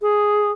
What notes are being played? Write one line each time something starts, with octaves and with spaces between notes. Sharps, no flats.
G#4